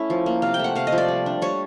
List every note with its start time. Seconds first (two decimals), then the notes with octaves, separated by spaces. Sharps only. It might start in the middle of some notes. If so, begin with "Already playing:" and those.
Already playing: A3 C#4 E4 E5
0.10 F3
0.26 A#3
0.42 C3 F5
0.54 G5
0.59 A3 F#5
0.75 C3 F5
0.87 D#5
0.92 F3
0.98 D5
1.08 G3
1.26 D4
1.42 G3 C#5